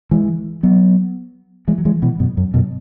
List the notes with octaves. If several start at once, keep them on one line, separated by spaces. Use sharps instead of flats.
E3 G#3
F#3 B3
E3 G#3
F#3
E3 G#3
B2 E3
F#2 B2
F#2
F#2 B2